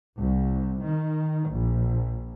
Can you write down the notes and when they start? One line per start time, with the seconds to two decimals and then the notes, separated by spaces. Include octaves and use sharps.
0.18 C2
0.83 D#3
1.49 A#1